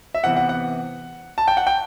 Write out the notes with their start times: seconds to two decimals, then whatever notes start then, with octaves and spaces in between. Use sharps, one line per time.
0.14 E5
0.24 C3 E3 B3 F#5
0.37 F#5
0.49 F#5
1.38 A5
1.48 G5
1.57 F#5
1.67 G5